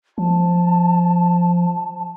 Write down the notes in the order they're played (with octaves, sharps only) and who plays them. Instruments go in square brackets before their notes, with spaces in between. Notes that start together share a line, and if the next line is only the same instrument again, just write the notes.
[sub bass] F3 [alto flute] A5